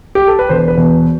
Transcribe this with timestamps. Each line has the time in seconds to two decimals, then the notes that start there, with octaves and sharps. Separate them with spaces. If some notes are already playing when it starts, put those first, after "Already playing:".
0.15 G4
0.28 A4
0.39 B4
0.49 E1 C5
0.68 B4
0.77 E2 B2